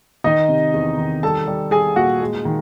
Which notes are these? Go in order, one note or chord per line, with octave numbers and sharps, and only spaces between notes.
D#3 D#4 D#5
C3
E2
D#3
G3 A4 A5
G3
G3 G#4 G#5
A#2 F#4 F#5
G#3
D#3